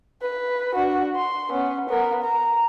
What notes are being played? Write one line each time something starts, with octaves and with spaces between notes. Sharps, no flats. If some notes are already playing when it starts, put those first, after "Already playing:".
B4
D4 F#4
C6
B3 C#4
B3 A#4
A#5